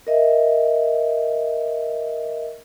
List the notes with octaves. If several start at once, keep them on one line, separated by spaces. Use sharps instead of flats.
A#4 D#5 E5